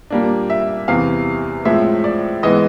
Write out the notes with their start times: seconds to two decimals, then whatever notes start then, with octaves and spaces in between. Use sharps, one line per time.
0.10 A#2 G3 A#3 D4
0.50 E5
0.88 E2 C3 E3 F5
1.65 A2 F3 G#3 C4 E5
2.04 D5
2.43 G#2 E3 G#3 B3 D#5